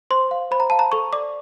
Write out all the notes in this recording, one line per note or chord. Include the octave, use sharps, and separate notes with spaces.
C5 C6
F5
C5 B5
A#5
F5 A5
A#5
A4 C#6
D5 D6